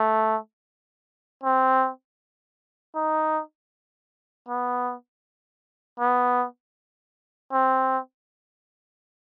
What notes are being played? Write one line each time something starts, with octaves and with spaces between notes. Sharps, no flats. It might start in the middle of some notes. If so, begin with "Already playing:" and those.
Already playing: A3
C4
D#4
B3
B3
C4